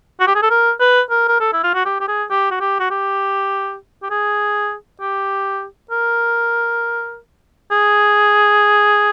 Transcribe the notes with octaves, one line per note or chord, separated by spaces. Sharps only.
F#4
G4
G#4
A4
A#4
B4
A#4
A#4
A4
E4
F4
F#4
G4
G4
G#4
G4
F#4
G4
F#4
G4
G4
G#4
G4
A#4
G#4